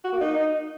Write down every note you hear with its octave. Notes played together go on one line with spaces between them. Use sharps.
F#4
A#3
D#4